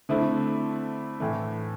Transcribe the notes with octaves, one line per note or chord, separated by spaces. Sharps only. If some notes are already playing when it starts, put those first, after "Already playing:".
D3 A3 C4 E4
A2 E3 A3